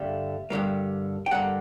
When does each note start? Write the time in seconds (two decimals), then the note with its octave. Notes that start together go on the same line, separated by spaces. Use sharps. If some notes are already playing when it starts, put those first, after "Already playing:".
Already playing: G2 D3 G3 A#3 E5
0.50 G2 D3 G3 A#3
1.26 G5
1.31 G2 D3 G3 A#3 F#5